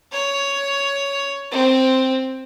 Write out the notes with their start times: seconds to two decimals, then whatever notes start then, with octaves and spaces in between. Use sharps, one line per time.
0.12 C#5
1.51 C4